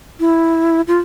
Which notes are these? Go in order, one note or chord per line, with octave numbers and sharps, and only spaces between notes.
E4
F4